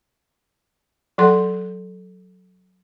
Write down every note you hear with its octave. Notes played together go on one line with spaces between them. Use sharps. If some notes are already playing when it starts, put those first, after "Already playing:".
F#3 A4 F#5 C6